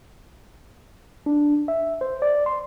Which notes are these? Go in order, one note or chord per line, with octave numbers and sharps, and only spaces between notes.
D4
E5
C5
D5
C6